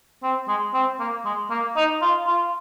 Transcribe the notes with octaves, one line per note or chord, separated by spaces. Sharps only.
C4
G#3
C4
A#3
G#3
A#3
D#4
F4
F4